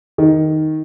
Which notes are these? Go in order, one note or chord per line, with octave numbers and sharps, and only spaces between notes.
D#3